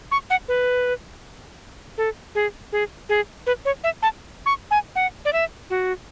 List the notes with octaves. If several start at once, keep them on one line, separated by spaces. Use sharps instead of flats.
C#6
F#5
B4
A4
G#4
G#4
G#4
B4
C#5
E5
A5
C#6
G#5
F#5
D5
E5
F#4